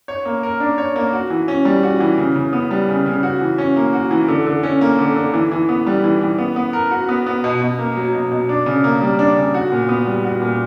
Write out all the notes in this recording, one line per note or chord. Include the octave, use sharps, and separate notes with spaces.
C#5
A#3
A#4
D4
C#5
A#3
F#4
E3
C#4
G3
F#4
E3
C#3
C#3
B3
G3
C#3
C#3
F#4
E3
C#4
A#3
F#4
E3
D3
D3
C#4
A#3
D3
D3
E3
E3
B3
G3
E3
E3
B3
B3
A#4
F#4
B3
B3
B2
B2
A#3
F#3
B2
B2
D4
C#3
A#3
G3
D4
C#3
F#4
A#2
B3
G3
F#4
A#2